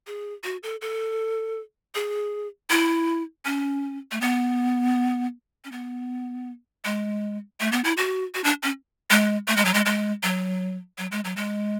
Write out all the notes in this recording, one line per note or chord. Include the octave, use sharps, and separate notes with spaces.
G#4
F#4
A4
A4
G#4
E4
C#4
A3
B3
C#4
B3
G#3
A3
B3
E4
F#4
F#4
D4
C#4
G#3
A3
G#3
F#3
G#3
G#3
F#3
F#3
G#3
F#3
G#3